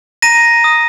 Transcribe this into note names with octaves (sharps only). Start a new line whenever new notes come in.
A#5 A#6 D#7
D#6